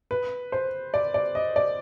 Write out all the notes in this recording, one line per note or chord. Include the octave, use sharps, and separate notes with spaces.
B4
C5
D5
D5
D#5
D5